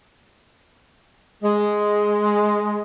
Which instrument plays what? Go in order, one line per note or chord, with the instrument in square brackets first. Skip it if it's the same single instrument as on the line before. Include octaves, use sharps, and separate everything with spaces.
[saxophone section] G#3